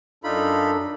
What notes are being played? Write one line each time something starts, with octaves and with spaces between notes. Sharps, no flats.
F#2 D4 D#4 F4 A4 B5